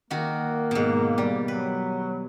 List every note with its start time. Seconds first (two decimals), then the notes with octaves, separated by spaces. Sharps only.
0.10 D#3 A#3 F#4
0.71 G#2 B2
1.18 G3
1.48 F#3 B4